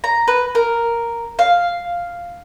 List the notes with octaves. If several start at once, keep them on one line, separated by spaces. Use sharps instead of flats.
A#5
B4
A#4
F5